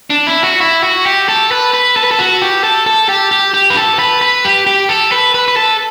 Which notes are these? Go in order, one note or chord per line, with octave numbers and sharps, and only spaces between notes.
D4
E4
F#4
E4
F#4
G4
A4
B4
B4
A4
B4
A4
F#4
G4
A4
A4
G4
G4
G4
B4
A4
B4
B4
G4
G4
A4
B4
B4
B4
A4